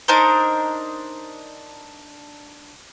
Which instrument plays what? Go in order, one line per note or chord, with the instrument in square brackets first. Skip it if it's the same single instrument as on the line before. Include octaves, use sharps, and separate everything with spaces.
[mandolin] D4 D#4 A#4 C5